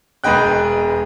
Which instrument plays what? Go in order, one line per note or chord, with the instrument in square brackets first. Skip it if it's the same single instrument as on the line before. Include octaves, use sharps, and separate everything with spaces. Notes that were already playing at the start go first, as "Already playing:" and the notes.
[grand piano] E1 G#3 B4 D#5 G5 F#6